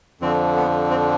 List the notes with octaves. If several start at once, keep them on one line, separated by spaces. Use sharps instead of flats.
F2 D3 F3 C4
B3
C4